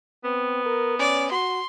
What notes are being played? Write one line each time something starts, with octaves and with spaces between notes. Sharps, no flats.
B3 C4
A#4
C#4 D5
F#4 C6